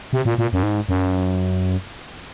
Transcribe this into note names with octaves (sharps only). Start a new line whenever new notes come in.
C3
A#2
A#2
F#2
G#2
F#2